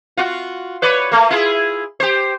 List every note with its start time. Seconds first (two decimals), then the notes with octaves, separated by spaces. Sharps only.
0.17 F4 F#4
0.82 B4 C#5 D5
1.11 A3 A#3
1.30 E4 F4 G#4
2.00 G4 C5